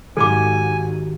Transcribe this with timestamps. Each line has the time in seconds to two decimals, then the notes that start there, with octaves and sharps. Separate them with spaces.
0.17 G#2 D#3 F#4 G4 A4 G#5 D6